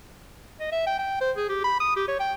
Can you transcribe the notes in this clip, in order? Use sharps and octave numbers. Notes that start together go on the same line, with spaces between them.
D#5
E5
G5
G5
C5
G#4
G4
B5
D#6
G4
C#5
G5